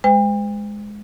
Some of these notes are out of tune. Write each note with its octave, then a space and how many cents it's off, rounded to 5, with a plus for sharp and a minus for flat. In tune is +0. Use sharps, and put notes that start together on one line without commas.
G#3 +0 C5 -45 G5 +40